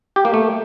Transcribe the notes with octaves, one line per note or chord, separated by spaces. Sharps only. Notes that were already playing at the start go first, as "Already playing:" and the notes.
G4
A#3
A3